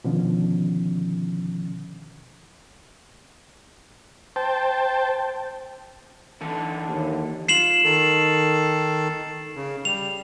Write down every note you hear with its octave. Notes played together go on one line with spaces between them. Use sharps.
B2 D3 D#3 F3 C#4
C5 G5 A5
D3 E3 A4
D#2
F4 C7 E7 F#7
D#3 A4
C#3
G3 F7